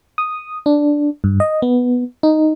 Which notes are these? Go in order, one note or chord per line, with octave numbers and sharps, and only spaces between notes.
D#6
D4
G2
D#5
B3
D#4